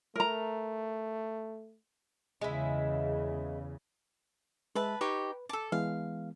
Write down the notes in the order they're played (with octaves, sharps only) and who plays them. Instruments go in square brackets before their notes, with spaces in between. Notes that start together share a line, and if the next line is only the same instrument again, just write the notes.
[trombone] A3 [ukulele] A#4 A#5
[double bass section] E2 C#3 [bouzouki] G#3 E4
[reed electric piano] G#3 E5 [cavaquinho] B4 A5
[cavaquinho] D#4 G4 C#5 [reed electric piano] B4
[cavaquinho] A4 A5 [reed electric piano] D6 E6
[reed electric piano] E3 G#3 B3 [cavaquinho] F5